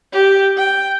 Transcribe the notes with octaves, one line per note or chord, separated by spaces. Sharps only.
G4
G5